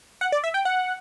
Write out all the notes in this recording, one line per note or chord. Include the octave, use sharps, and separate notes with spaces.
F#5
D5
E5
G5
F#5